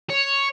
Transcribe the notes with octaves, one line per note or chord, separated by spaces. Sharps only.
C#5